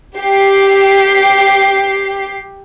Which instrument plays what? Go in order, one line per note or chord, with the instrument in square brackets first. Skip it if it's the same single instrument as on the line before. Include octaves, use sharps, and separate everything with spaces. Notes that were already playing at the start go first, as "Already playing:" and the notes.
[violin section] G4 C7